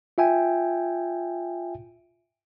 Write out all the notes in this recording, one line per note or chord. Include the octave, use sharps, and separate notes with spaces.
F4 E5 G5 G#5